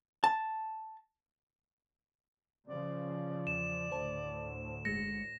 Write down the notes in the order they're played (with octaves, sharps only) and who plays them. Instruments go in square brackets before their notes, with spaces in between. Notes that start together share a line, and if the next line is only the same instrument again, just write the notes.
[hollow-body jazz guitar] A5
[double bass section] C#3 F3 [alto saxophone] D5
[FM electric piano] E2 [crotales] E7
[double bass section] D2 A2 [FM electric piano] C5 A5
[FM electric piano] G1 G#3 C#7 [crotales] A#6